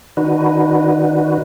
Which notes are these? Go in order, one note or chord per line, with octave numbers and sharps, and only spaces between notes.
D#3 D4 D#4 F#4 B4